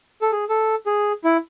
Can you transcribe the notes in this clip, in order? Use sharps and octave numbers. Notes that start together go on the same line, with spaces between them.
A4
G#4
A4
G#4
E4